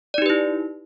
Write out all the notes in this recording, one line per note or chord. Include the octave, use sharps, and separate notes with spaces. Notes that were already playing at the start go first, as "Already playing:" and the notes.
D#4 E4 G4 B4 D5